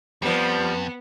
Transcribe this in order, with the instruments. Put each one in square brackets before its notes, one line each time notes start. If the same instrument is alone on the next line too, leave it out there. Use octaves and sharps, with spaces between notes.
[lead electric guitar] F2 [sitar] F3 G3 [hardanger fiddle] B3